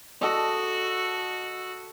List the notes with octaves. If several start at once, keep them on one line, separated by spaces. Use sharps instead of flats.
F#4 A4 D#5